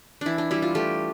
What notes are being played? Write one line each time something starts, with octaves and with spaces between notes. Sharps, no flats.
E3 D4 E4
D4
G3 E4
F4
A3 G4